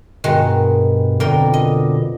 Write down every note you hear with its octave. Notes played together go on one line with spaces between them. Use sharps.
G2 B2 D#3 G#3 F#4
F2 B2 D3 A#4 G5
D#5